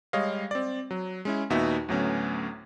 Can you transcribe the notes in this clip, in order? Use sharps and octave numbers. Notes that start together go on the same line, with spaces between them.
G3 G#3 C#5 D#5 F5
C4 D5
F#3
G#3 C#4 E4
D#2 A#2 B3 D#4 F#4 E5
D2 A2 F#3 B3 C#4